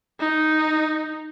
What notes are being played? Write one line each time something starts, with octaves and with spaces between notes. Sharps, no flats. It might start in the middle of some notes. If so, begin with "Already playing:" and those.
D#4